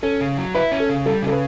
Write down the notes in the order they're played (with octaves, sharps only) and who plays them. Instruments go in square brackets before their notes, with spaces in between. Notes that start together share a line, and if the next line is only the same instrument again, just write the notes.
[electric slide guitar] C#4 [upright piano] A4
[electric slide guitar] C#3
F#3
[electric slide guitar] E4 [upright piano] B4
[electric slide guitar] C#4
[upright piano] A4
[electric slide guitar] C#3
[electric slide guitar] G3 [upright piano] A4
[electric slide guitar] C#3 [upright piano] A4
[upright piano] B4